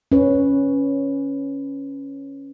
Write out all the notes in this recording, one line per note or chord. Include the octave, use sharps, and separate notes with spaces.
C#4 B4